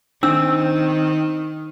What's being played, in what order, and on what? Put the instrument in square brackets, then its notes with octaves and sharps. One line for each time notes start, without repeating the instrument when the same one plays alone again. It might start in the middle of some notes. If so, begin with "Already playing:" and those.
[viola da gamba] D#3 [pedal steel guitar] C4 [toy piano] D4 E6